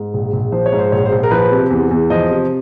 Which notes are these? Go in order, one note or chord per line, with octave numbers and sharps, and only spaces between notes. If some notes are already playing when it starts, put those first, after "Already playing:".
Already playing: G#2
A#1
A#1
F3 C5
C#5
G#2
C5
A#1 C#5
C5
A#1
A#4
F3 B4
C3
E2
E2
F3 D#5
C3